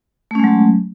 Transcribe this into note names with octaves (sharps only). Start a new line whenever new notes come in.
F#3 G#3 A3 C#4